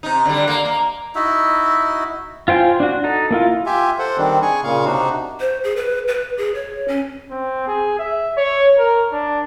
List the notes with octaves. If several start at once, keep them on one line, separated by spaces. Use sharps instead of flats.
C3 D#4
D3 G3
A#3
A#3
D#4 E4 F#4 E5
F4 C5 G5 G#5
D4 F#4
D#4 A4
A#3 E4 F4
F4 G4 E5 G#5
A4 C5 F#5
D#3 G3 C4 D4
G#4 G#5 C#6
A#2 C#3 F5 C#6
C3 D4 D#4 F#4
C5
G#4
B4
B4
G#4
C#5
C#4
C4
G#4
E5
C#5
A#4
D4